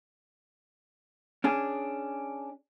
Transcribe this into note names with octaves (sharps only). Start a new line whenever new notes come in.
C#4 D4 G#4